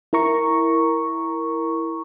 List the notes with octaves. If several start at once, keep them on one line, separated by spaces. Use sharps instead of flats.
E4 A#4 A#5 C#6